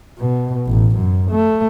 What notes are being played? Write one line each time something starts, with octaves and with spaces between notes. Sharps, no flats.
B2
A1
F#2
A3